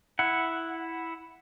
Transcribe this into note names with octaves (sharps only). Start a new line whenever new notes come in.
E4 F#5